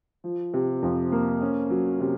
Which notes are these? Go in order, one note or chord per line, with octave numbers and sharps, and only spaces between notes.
F3
C3
F2
A#3
C#4
F#3
C3